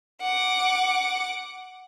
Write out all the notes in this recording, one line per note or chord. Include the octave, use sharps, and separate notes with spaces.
F#5 D6